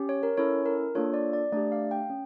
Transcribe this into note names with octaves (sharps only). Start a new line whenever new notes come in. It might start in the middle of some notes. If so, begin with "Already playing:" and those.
Already playing: C#4 G4
C#5
A#4
C#4 E4 A4 C#5
A#4
A#3 D4 F4 A4 C#5
D5
D5
A3 D4 G4 D5
F5
G5
C#4